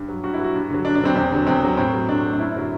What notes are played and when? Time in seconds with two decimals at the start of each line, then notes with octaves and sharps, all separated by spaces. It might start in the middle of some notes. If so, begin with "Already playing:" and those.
Already playing: G2
0.08 F#3
0.23 G2 F#4
0.33 E4
0.39 F#3 F#4
0.55 G2
0.70 D3 F#3
0.85 G2 D4
0.95 D4
1.00 D3 F#3 C4
1.15 E2 C4
1.32 D3 F#3
1.47 E2 C4
1.63 D3 F#3
1.77 A2 C4
1.93 F#3
2.08 A2 D4
2.24 F#3
2.33 D4
2.39 F#2 E4
2.56 D3 F#3